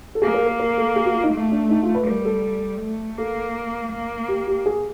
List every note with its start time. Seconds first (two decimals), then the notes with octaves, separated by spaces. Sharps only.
0.15 A4
0.22 A#3 G#4
0.34 A#4
0.46 A#4
0.59 A#4
0.78 A4
0.96 G#4
1.06 F#4
1.14 F4
1.23 D#4
1.33 A3
1.51 D4
1.70 D#4
1.83 F4
1.95 B4
2.07 G3 A#4
2.25 A4
2.81 A3
3.17 A#3 A4
3.92 A#3
4.28 G4
4.47 G4
4.66 G#4